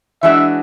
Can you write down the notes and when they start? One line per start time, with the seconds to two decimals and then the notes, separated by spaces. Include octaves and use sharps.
0.23 E3 G#3 D4 F#4 E5